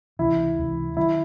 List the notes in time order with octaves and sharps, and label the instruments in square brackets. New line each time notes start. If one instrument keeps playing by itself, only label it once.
[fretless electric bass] C#2 C3 E3 [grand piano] E4
[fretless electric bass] C#2 C3 E3
[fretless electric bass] D#3 F#3 [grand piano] E4